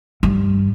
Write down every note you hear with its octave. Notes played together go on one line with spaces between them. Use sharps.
G2